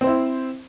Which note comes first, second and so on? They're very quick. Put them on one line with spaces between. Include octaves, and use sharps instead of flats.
C4 C5 E4